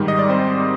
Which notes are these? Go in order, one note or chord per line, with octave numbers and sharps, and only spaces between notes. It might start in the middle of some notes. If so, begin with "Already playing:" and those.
Already playing: G#2 D#3 G3
D#5
D5
C4 C5